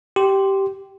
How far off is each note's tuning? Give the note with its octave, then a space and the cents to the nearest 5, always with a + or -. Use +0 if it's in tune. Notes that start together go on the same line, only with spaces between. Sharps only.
G4 -10 C6 +0